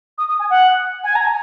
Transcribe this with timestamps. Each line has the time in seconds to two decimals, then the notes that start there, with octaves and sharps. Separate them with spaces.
0.18 D#6
0.28 D#6
0.39 G#5
0.50 F#5
1.04 G#5
1.15 A#5
1.27 G#5